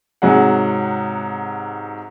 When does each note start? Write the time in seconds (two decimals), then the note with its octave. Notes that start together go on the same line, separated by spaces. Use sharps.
0.22 G#2 C3 F#3 G#4 F#5